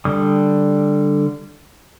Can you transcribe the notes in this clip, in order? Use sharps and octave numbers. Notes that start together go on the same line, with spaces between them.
D3 G3 D#6